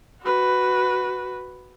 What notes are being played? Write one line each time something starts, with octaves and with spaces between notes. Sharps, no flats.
F#4 B4